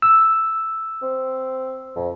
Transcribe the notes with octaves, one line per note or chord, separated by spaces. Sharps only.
E6
C4
F2